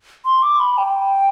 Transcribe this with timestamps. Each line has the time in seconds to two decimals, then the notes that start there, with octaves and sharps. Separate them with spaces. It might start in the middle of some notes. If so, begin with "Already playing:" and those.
0.25 C6
0.42 D6
0.60 B5
0.78 G5